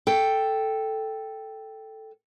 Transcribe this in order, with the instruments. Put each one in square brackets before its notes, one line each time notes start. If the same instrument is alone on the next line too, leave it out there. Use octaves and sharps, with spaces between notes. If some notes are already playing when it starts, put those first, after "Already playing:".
[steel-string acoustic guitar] A4 G5